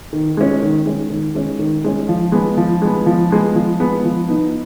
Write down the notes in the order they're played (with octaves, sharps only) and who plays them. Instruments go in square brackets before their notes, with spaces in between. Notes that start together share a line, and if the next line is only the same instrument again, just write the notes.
[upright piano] D#3
G#3 C#4
D#3
G#3 C#4
D#3
G#3 C#4
D#3
G#3 C#4
F3
G#3 B3
F3
G#3 B3
F3
G#3 B3
F3
G#3 B3
F3
B3 D#4